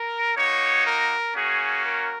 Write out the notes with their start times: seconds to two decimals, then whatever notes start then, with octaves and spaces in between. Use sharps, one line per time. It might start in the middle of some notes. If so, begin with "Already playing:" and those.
Already playing: A#4
0.36 A#3 D#4 F#4 C#5
0.85 A#4
1.35 A#3 C#4 F#4 G#4
1.84 A#4